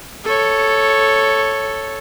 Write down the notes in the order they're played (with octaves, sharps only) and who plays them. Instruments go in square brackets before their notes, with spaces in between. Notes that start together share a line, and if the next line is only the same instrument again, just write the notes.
[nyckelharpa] A4 C#5